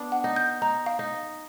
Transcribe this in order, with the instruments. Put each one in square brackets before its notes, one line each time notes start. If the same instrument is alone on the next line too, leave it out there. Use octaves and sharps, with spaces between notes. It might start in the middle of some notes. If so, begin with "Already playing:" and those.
Already playing: [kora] B3 D4
[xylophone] F#5
[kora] D#4
[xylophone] G6
[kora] D#4 [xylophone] A#5
[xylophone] F5
[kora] D#4